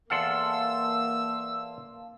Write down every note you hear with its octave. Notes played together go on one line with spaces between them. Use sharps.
E2 A#3 A4 F5 F#5 A5 C6 E6